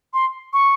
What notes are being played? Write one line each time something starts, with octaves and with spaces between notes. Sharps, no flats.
C6
C#6